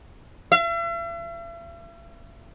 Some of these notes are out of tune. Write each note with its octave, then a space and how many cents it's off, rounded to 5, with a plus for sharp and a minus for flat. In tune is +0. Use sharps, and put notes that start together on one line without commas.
E5 +45